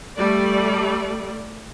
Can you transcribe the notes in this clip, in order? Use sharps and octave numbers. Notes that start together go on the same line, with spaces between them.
G3 A3 D5